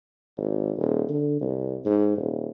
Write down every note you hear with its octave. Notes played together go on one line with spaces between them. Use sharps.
G#1
D#1
D3
C2
G#2
D#1